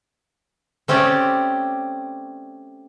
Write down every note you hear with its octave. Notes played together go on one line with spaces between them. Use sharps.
A3 C4 C#4 G4 D5